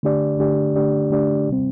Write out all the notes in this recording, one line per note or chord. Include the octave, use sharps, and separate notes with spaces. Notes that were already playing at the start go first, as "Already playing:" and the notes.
D3 A3 D4 G4 D5
D3 A3 D4 G4 D5
D3 A3 D4 G4 D5
D3 A3 D4 G4 D5
C3 G3 C4